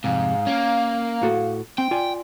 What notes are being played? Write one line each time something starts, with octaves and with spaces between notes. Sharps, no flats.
F2 G#2 C3 F5
A#3 C#4
A2 F#4 A4
C4 G5
F4 D5 G#5